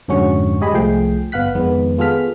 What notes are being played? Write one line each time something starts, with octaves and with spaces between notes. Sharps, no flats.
F2 G#2 D3 C#4 F#4 C#6
G#3 G4 D#5 G#5 B5
C2 F3 A3 G#4 G5 C7
G1 B3 F5 F#5 F#6 B6
F2 D#3 G#3 B3
B3 F4 G#4 A4 F6 B6